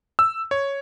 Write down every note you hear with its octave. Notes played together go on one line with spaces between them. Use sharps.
E6
C#5